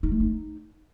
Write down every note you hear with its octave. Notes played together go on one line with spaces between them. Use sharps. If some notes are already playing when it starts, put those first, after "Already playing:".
D#4
A3
D#4